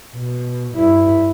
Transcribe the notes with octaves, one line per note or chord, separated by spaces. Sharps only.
B2
G2 E4